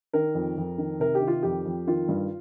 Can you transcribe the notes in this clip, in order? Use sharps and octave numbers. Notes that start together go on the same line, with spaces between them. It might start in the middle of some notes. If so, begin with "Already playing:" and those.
D#3 A#4
F2
F2
D#3
C3 A#4
G4
D#3
F4
F2 G4
F2
D#3 F4
G2